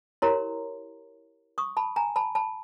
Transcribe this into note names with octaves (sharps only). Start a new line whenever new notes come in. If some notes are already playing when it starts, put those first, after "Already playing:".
E4 G4 A#4 C#5 A#5 C6
C#6 D#6
A5 B5
G#5 A#5
A5 B5
A5 B5